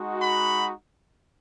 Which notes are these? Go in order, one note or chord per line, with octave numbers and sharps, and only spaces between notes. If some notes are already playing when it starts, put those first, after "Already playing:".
Already playing: G#3 D#4 F#4
B5